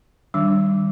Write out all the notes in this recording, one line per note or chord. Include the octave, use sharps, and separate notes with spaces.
D#3 G3 D4